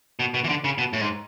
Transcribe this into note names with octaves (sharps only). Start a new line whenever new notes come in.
B2
B2
E3
D3
C#3
B2
A2
G#2